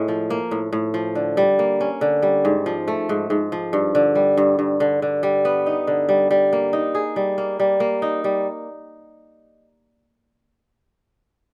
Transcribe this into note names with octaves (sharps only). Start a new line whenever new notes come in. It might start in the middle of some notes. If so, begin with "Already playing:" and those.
Already playing: A2 G#3
F3
A#3
A2
A2
F3
D3
G3
A#3
C#4
D3
G3
G#2
F3
A3
G#2
G#2
F3
G2
D3
G3
G2
G2
D3
D3
G3
B3
D#4
D3
G3
G3
A#3
D#4
G#4
G3
A#3
G3
A#3
D#4
G3